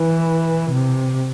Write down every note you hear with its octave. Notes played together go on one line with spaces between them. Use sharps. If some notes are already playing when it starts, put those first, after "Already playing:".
Already playing: E3
C3